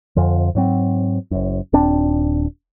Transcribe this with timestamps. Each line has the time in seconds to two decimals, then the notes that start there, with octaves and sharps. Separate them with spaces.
0.16 F2 D3 F3
0.55 G#2 F#3 C4
1.31 F#1 F#2
1.73 D#1 C4 D4